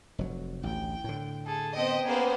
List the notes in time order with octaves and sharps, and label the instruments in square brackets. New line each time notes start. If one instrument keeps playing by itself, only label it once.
[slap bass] F1 F#3
[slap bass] A1 D2 [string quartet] G5
[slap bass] A2 D3
[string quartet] G#4 [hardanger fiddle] A4
[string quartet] B3 C4 C5 [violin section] D#5 [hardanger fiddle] G5
[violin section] A#3 B3 C5 [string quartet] C#4 G#4